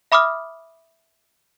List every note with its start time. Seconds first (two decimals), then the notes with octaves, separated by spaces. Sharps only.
0.12 E5 B5 D6 D#6 F6